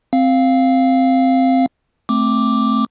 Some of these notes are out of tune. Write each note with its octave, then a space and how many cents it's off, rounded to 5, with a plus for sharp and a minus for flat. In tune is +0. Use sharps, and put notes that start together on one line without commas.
C4 +0 F5 +0
A3 +0 C4 +5 D6 +0